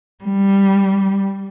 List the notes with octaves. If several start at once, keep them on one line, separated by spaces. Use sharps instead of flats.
G3